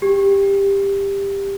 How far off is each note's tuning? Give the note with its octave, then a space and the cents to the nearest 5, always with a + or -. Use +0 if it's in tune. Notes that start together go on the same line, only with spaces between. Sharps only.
G4 +15